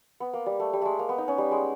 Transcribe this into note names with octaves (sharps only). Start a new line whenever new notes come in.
B3
A#3
G3
A3
G3
G#3 A3
A#3
B3
D#4
C#4
G3
G#3